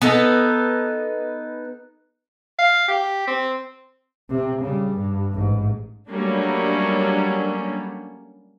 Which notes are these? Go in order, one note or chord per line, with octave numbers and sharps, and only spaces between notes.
B3 D#4 A4
F5
G4
C4
C3 C4
C#3 G3
G2
A1 G#2
F#3 G3 A3 A#3 C#4 D4